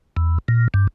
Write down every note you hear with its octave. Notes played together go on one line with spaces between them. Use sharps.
E2
A#2
G2